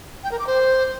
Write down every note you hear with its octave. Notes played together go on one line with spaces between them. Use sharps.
G5
A#4
D6
C5